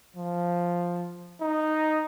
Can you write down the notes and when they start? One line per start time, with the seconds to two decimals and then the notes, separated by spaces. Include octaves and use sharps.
0.16 F3
1.41 D#4